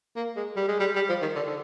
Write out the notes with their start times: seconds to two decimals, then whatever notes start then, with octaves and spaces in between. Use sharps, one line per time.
0.16 A#3
0.36 G#3
0.56 G3
0.68 G#3
0.80 G3
0.96 G3
1.09 F3
1.22 D#3
1.36 D3
1.47 D3